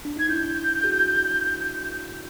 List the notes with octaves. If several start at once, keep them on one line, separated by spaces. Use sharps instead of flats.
D4
D#4 G#6
D4 E4 G6
F#4 G#4